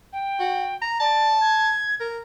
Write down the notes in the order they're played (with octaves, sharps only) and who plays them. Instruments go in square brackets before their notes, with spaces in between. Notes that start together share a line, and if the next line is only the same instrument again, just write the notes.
[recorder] G5
[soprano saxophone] F#4
A#5
[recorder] D5 [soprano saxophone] A5
[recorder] G#6
[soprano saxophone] A#4